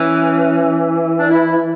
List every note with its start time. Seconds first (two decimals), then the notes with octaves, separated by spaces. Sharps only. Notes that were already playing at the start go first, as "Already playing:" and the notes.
Already playing: E3 C#4
1.19 D4
1.30 E4